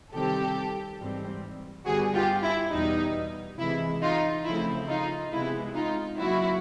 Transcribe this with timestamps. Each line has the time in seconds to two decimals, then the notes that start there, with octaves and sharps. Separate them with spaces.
0.12 C3 D#3 G3 C4 G4 A4
0.99 G#2 E3 G3 C4
1.85 G2 D3 G3 B3 F#4 G#4
2.14 F4 G4
2.44 E4
2.72 E2 B2 G3 B3 D#4
3.59 C3 E3 G#3 E4
4.02 D#4 F4
4.45 C#3 F3 A3 C4 E4
4.89 D#4 F4
5.32 C3 F3 G#3 B3 E4
5.75 D#4 F4
6.19 C#3 F#3 A#3 E4 F#4